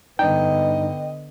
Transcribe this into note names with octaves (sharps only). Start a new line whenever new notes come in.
G2 D3 B3 D#4 D#5 G5